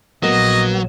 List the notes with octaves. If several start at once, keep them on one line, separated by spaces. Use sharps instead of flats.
A#1 F#3 A#3 B3 D#5